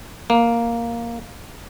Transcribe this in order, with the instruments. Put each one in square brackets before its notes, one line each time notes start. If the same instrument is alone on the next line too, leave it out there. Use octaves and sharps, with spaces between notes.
[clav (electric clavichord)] A#3